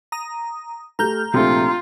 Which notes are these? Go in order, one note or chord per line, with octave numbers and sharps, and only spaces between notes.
A#5 D#6
A3 G4 A#5 F6 G6
A#1 C3 A3 F4